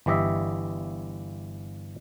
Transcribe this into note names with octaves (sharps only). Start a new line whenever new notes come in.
G1 E3 G4 D#5 E5